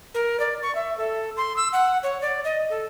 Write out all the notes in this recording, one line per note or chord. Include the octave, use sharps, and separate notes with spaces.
A#4
D5
C#6
E5
A4
C6
E6
F#5
C#5
D5
D#5
A4